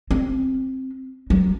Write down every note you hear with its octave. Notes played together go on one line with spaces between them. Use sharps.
C4
F#3